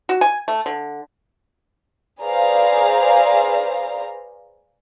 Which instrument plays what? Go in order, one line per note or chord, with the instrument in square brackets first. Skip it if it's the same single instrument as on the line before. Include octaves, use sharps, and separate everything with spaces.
[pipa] F#4
G#5
A3
D3
[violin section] G#4 B4 C5 D5 F5 A#5